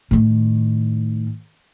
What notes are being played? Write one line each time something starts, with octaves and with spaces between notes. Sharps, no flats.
A2 D#3